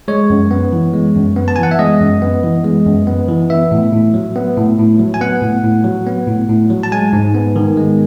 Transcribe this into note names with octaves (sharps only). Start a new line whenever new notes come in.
G#3 C#5
F#2
B3
E3
G#3
F#2
B3
A5
E3 G#5
F#5
E5
G#3 D#5
F#2
B3
E3
G#3
F#2
B3
E3
B3 E5
A2
A2
F#3
B3
A2
A2
F#3
G#5
B3 F#5
A2
A2
F#3
B3
A2
A2
F#3
A5
G#3 G#5
G#2
B3
D#3
G#3